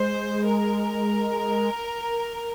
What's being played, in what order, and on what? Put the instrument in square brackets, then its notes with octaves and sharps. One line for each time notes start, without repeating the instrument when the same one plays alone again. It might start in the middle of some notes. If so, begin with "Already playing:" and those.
Already playing: [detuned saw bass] G#3 [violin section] C5
[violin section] A#4